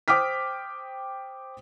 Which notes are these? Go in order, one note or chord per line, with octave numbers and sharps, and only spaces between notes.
C5 G5 D6 D#6 F6 B6